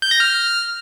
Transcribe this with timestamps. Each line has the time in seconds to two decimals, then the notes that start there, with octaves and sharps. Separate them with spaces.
0.02 G6
0.11 A#6
0.20 F6